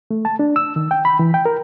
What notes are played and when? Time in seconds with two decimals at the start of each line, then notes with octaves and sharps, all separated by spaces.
0.11 A3
0.25 A5
0.39 D4
0.56 E6
0.76 D#3
0.91 G5
1.05 B5
1.19 E3
1.34 G5
1.45 A#4